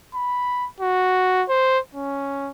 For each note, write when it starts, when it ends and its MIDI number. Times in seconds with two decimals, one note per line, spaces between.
0.15 0.67 83
0.80 1.44 66
1.49 1.79 72
1.95 2.51 61